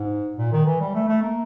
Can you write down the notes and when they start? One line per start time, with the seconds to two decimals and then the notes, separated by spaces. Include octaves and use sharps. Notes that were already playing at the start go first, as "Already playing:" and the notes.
Already playing: G#2
0.37 A#2
0.52 D#3
0.66 E3
0.80 G3
0.94 A3
1.08 A3
1.22 A#3